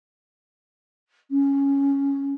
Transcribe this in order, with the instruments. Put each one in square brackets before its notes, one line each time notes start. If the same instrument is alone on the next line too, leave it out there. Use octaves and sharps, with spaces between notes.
[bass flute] C#4